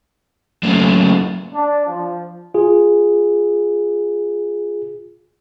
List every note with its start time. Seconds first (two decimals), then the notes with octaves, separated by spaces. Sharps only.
0.63 F#3 A3 A#3 C#4
1.52 D4
1.86 F3
2.54 F4 G#4